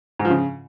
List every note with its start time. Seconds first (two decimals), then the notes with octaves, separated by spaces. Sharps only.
0.19 G#2
0.25 F3
0.30 C#3